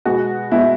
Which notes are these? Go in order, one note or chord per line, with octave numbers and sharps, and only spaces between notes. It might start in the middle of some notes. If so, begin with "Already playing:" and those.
B2 G#3 B3 F#4
B2 G#3 B3 E4